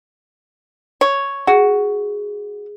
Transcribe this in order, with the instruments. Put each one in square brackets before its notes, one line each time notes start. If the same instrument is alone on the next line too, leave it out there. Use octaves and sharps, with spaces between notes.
[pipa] C#5
[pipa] F#4 [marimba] G#4